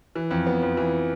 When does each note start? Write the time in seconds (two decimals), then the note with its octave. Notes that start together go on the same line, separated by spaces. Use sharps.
0.16 E3
0.31 F2
0.47 B3
0.62 F2
0.77 E3